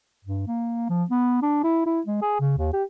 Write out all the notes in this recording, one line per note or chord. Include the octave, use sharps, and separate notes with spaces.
G2
A#3
F3
B3
D4
E4
E4
G#3
G#4
C#3
D#2
G4